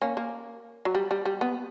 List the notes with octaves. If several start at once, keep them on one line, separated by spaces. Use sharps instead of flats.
A#3 C#4
A#3
F#3
G3
G3
G3
B3